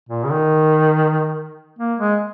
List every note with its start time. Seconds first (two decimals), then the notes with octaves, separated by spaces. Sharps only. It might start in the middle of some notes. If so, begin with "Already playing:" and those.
0.09 A#2
0.24 C#3
0.31 D#3
1.79 A#3
2.00 G#3